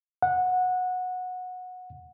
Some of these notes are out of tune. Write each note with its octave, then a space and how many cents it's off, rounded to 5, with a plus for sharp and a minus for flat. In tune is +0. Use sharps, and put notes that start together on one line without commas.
F#5 -15